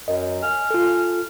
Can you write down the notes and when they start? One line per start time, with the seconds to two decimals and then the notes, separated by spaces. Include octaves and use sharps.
0.08 F#2 D#5
0.43 G#5 F6
0.71 F4 A4